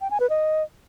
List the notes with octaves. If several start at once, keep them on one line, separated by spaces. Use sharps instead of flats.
G5
G#5
B4
D#5